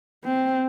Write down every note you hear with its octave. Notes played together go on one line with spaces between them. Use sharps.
C4